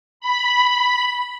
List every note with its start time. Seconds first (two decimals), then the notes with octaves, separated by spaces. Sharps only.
0.20 B5